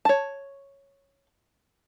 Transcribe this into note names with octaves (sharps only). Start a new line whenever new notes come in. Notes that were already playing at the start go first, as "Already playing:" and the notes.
C#5 A5